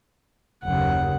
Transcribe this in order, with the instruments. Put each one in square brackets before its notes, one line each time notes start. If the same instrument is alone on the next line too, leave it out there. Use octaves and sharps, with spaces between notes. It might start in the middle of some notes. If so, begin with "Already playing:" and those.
[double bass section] F#1 D#2 C#3 [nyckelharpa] F#5